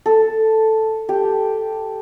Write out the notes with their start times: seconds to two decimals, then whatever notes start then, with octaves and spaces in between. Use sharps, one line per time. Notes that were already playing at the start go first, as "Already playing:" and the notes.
0.06 A4
1.09 G4